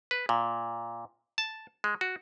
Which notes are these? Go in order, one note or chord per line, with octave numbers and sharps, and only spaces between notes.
B4
A#2
A5
G#3
F#4